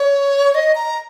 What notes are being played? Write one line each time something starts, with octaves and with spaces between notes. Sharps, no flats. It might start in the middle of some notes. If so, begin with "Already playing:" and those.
Already playing: C#5
D#5
A#5